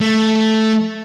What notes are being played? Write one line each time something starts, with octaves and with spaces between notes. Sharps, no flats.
A3